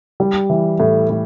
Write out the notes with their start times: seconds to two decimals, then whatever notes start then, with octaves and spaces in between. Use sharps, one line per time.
0.20 G3
0.50 E3
0.80 A2
1.10 A2